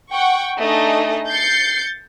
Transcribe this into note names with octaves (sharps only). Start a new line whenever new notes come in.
F#5 G5 C#6
A3 D4 D#4 G#4 D#5
G6 A6 C7 C#7